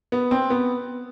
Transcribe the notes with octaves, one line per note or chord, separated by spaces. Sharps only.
B3
C4
B3